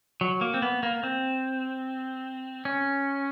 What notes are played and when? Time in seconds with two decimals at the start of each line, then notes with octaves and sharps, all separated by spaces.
0.21 F#3
0.41 A#3
0.54 C4
0.62 B3
0.83 A#3
1.03 C4
2.65 C#4